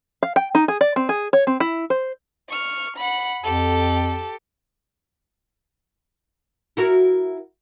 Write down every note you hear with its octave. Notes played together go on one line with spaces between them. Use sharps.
F5
G5
D#4
G#4
D5
C4
G#4
C#5
C4
E4
C5
C#6 F6
F#5 B5
F2 G4 A4
E4 F#4 A#4